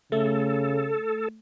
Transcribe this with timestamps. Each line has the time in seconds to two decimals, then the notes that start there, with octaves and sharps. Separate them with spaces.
0.12 C#3 A3 A4